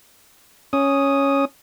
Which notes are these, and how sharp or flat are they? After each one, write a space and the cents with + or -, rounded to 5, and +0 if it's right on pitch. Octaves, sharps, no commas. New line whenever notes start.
C#4 +0 D#6 +0